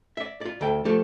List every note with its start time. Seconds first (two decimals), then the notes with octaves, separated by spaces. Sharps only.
0.17 D5 E5
0.41 F4 D5
0.61 D2 A4 G5
0.85 F3 A3 G4 A4